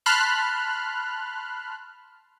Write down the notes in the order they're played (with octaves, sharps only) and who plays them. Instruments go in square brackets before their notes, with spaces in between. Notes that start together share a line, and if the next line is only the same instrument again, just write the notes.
[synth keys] A5 B5 C6 F6 F#6